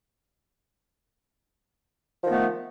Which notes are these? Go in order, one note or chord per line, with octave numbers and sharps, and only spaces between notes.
D#3 F3 A3 B3